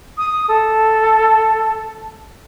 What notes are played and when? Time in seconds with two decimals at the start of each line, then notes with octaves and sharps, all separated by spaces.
0.18 D#6
0.48 A4